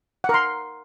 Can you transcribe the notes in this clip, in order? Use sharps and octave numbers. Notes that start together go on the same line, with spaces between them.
A#4 F#5 C6